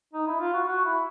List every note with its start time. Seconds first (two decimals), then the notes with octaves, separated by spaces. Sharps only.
0.13 D#4
0.27 E4
0.40 F4
0.54 F#4
0.68 F#4
0.85 E4